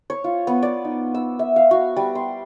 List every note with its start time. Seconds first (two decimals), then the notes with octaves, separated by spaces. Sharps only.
0.10 C#5
0.24 F4
0.47 B3
0.63 D5
0.85 D#4
1.14 E6
1.39 E5
1.56 F5
1.71 F#4
1.96 G3
2.15 C6